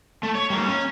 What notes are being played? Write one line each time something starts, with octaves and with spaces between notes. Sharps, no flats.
A3
C#5
G3 A#3
C#4